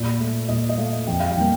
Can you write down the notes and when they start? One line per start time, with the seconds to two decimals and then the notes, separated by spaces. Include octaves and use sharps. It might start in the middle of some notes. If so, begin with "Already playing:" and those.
Already playing: A#2 D5
0.20 A3
0.49 A#2 D#5
0.69 D#5
0.78 A3 F5
1.07 F2 G5
1.20 F5
1.31 G5
1.37 D#3 G3 A#3